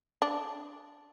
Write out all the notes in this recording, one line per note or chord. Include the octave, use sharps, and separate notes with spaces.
D4